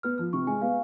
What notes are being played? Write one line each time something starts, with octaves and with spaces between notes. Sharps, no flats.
B3 F6
F3 F6
C3 C#6
G#3 G#5
B3 F5